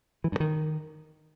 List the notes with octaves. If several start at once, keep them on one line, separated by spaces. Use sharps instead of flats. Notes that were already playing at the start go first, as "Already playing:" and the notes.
E3
G2
D#3